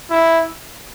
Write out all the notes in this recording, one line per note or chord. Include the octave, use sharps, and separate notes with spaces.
E4